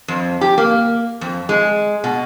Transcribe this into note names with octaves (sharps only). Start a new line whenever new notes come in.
F2
G4
A#3
F2
G#3
B2